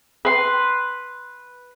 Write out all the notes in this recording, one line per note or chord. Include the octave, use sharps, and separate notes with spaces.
B4 C6